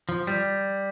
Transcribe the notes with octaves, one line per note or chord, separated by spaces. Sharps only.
F3
G3